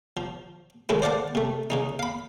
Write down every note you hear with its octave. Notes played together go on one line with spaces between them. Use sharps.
F3
D#3 E3 G#3 A3 C#4 E4
C5 D5 F5 F#5 A5
C3 A3
C#3 E3 D#4
F5 B5